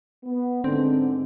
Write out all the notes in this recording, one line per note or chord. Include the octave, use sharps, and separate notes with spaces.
B3
G#2 D3 C4